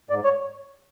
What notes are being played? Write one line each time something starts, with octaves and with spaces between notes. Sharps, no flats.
G#2 D5
C#5